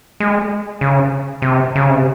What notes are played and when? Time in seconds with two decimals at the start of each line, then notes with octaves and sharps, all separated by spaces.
0.20 G#3
0.81 C#3
1.42 C3
1.75 C#3
1.90 C3